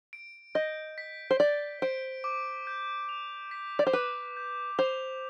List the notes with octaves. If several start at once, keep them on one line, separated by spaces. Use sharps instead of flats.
D7
D#5 G6
B6
C5
D5 G7
C5 D7
D6
G6
F7
B6
D5
C5
B4 D6
G6
C5 F7